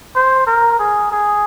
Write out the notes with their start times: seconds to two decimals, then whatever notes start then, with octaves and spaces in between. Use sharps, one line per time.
0.15 C5
0.47 A#4
0.79 G#4
1.12 G#4